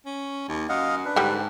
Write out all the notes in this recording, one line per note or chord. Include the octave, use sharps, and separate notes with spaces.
C#4
D#2
F#2 D#5 F5 F#5
D4 B4
G#2 D3 G3